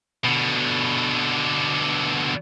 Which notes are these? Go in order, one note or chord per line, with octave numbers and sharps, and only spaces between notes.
B2 D3